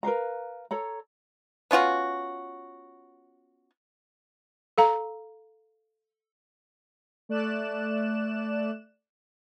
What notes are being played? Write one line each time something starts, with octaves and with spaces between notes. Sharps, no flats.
A#4 B4 F5 A#5
A4 C#5 A#5
B3 C#4 F4 F#4
A4 F5 A#5
A3 D5 F#6 E7